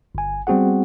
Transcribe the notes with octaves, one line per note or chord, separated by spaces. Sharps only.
G1 G#5
G3 B3 C4 F#4 G#4 F#5